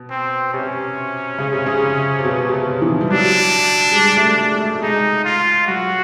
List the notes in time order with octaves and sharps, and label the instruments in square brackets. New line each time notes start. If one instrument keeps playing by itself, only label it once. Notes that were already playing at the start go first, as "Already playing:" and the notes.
Already playing: [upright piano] B2
[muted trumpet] C4
[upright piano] C3 [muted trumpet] C#4
[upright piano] C#3
C3
C#3
C3
B2
B2
C3
E3
G3
[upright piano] F#3 [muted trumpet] D4
[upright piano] G#3
G3
A3
G#3
A3
A3
[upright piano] G#3 [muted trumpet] D#4
[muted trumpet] F4
[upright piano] F#3 [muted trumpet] F#4